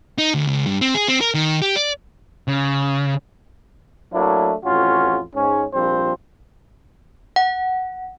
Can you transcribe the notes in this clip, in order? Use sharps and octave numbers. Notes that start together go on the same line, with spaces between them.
D#4
D2
C#2
G2
C4
G#4
C4
A#4
D#3
G4
D5
C#3
F#3 A3 A#3 D4 E4
A1 F2 C#4 F4 F#4
G#2 C#4
A#1 F3 G3 C4 C5
F#5